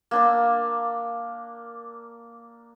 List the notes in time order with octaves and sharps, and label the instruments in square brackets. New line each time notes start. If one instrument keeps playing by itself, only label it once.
[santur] A#3 D4 E6